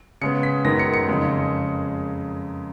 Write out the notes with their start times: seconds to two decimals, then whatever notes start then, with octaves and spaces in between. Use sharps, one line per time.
0.21 C#3 G#3 B3 C#7
0.43 B6
0.64 F#2 D#3 G#3 B3 A#6
0.79 C#7
0.94 C#7
1.08 F2 C#3 G#3